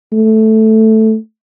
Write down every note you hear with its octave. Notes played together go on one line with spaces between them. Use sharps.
A3